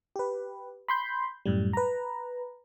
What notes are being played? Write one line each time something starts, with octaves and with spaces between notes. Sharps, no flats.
G4 B4
B5 C6 G6
F#2 A2 G3
B4 A#5